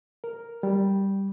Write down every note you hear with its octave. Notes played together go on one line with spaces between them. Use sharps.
A#4
G3